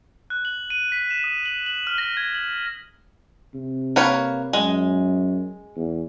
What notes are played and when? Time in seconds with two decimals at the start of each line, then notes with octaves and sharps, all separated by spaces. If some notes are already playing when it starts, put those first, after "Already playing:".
0.30 F#6
0.45 F#7
0.70 D#7
0.92 B6
1.11 E7
1.24 D#6
1.46 F#7
1.66 F#7
1.87 F6
1.98 A#6
2.17 G#6
2.35 F#7
3.54 C3
3.96 A#3 B4 C#5
4.53 F#2 G#3
5.76 E2